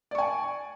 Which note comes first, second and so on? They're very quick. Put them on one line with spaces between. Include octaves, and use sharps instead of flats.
D5 C#6 G#5